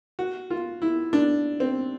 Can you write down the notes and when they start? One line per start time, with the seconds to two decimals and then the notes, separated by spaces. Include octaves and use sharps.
0.19 F#4
0.50 F4
0.82 E4
1.13 D4
1.60 C4